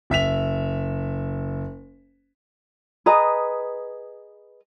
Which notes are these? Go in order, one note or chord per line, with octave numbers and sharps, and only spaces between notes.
F#1 E5 B6 F7
G#4 B4 D#5 A#5